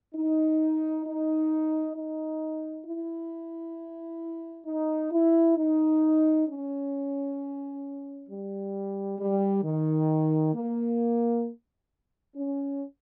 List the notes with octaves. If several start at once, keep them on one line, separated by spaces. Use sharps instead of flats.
D#4
D#4
D#4
E4
D#4
E4
D#4
C#4
G3
G3
D#3
A#3
C#4